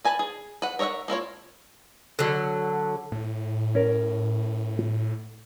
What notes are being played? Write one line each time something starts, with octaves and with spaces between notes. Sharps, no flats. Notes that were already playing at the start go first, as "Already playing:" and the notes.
B4 G#5 A5 B5
G#4
B4 F#5
A#4 C#5 D#5 E5 F#5
A#3 E4 F4 C#5
D3 F#3
A2
C#4 A#4